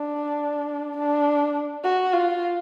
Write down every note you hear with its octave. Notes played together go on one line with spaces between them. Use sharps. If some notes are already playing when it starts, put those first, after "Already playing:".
Already playing: D4
D4
F#4
F4